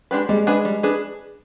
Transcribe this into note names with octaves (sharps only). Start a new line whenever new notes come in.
G#3 D4 G4 B4
G3 G#3
D4 G#4 B4
G3
D4 G#4 B4